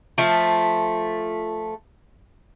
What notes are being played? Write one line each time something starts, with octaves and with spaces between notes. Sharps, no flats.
F3 A3